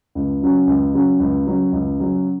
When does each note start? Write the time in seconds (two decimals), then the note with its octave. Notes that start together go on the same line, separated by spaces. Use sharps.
0.15 C#2
0.42 C#3 F#3 C#4
0.67 C#2
0.94 C#3 F#3 C#4
1.20 C#2
1.47 C#3 F#3 C#4
1.72 C#2
1.99 C#3 F#3 C#4